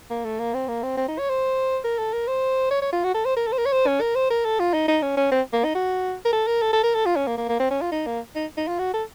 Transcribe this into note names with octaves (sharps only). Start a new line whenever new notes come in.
A#3
A3
A#3
C4
A#3
C4
C4
D#4
C#5
C5
A#4
A4
A#4
C5
C#5
C#5
F4
F#4
A4
C5
A#4
A4
C5
A#4
C#5
C5
C#4
A#4
C5
A#4
A4
F4
D#4
D#4
C#4
C#4
C4
A#3
D#4
F#4
A#4
A4
A#4
A4
A4
A#4
A4
F4
C#4
A#3
A#3
A#3
C4
C#4
F4
D#4
A#3
D#4
D#4
F4
F#4
A4